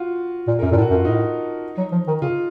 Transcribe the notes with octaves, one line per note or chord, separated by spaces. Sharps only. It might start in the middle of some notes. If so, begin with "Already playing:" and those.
Already playing: F4 F#4
A#2
F#2 A#4
A#2 A4
A2
F#4
F#2
F4
A2 D#4
F#3
F3
D#3
C#3 F4